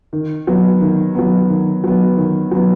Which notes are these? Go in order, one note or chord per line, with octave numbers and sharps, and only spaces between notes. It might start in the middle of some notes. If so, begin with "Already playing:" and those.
D#3
F#3 B3
D#3
F#3 B3
D#3
F#3 B3
D#3
F#3 B3